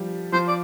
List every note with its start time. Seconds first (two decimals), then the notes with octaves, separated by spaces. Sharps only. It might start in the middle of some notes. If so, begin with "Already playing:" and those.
Already playing: F3 G3
0.33 F3 C5
0.48 D5